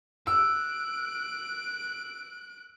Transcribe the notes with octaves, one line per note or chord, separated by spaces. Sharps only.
E6 F#6 D7